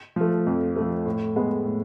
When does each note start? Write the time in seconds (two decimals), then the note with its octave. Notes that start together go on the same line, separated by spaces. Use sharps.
0.16 F3 A3
0.47 F2
0.76 F3 A3
1.06 A2
1.36 G#3 B3
1.65 A2